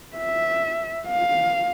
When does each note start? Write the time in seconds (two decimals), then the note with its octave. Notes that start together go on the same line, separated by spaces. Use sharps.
0.17 E5
1.08 F5